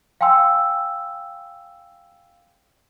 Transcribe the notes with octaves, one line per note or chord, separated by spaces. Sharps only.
F5 G5 G#5 C6 E6